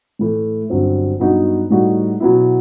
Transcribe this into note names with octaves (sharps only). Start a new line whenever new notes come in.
A2 E3 A3
G1 G2 F#3 C4
G2 F#3 B3 D#4 F#4
A2 G3 D#4 F#4
B2 F#3 B3 E4